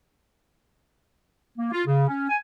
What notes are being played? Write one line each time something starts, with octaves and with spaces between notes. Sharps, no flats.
A#3
F4
C#3
C#4
G#5